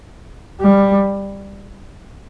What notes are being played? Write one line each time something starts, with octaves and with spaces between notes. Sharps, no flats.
G3